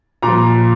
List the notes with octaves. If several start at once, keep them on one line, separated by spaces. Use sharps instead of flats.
A#2 F3 A#5